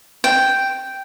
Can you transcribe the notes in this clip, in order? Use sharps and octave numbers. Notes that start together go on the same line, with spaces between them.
G5